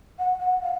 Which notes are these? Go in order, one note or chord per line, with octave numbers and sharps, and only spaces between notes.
F#5
F#5
F5